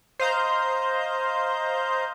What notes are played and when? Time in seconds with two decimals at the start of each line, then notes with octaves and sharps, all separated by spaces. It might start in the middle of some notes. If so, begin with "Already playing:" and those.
0.20 C5 D#5 F5 A#5 G6